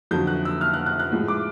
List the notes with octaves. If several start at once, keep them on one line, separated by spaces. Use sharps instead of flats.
F2 D3 F#3 G6
F#6
E6
F6
F#6
F#6
F#6
A2 F3 G#3
D6